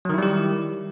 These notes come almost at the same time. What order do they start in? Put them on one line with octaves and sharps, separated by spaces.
F#3 D#3 E4 G3 G4